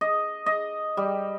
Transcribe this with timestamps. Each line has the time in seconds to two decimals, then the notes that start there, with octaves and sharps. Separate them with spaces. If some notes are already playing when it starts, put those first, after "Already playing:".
0.01 D#5
0.46 D#5
0.97 G3